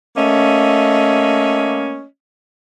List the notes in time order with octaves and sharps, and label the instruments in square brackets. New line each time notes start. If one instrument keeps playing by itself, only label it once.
[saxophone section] A3 A#3 C#4 D#5